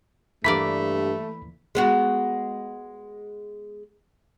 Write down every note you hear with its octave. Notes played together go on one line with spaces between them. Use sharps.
G2 E3 A3 A#3 D5 B5 B6
G#3 B3 F#4